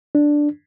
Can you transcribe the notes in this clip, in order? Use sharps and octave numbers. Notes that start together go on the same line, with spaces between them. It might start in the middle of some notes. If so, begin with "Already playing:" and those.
D4